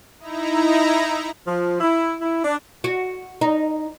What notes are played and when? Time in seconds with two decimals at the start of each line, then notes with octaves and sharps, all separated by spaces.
0.19 D#4 E4 A#5
1.47 F3
1.81 E4
2.21 E4
2.43 D4
2.84 F#4
3.41 D#4